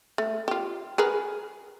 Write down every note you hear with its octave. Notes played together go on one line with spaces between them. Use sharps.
A3
F4 G4
G#4 A#4 B4